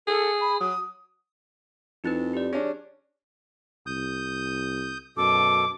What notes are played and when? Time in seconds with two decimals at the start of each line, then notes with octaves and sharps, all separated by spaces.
0.07 G#4 A4
0.41 B5
0.60 F#3 D#6
2.04 F2 D#4 E4 B4
2.34 G4 D5
2.53 C#4 D4 G#4
3.87 C2 D#6 G6
5.17 F#2 B2 A4 D6